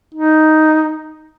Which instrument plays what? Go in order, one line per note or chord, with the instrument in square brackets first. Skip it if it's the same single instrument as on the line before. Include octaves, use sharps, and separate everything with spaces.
[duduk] D#4